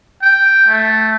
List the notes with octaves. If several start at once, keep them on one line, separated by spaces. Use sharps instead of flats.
G5
A3